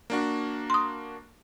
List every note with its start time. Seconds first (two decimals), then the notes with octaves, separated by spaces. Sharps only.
0.10 A#3 D4 F#4
0.70 C6 D#6